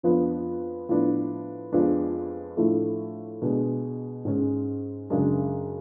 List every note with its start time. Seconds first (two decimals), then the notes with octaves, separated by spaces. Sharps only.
0.03 F2 F3 B3 D4
0.89 A2 F3 B3 D4
1.73 F2 F3 G#3 B3 D4
2.57 A2 F3 A3 D4
3.42 B2 G#3 D4
4.25 G#2 G#3 C#4
5.10 F#2 C#3 G#3 D4